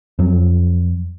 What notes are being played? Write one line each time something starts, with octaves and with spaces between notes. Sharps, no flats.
F2 F#3